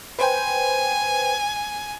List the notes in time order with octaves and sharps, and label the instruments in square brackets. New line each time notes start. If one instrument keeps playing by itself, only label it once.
[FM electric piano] B4 C5 G5 [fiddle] G#5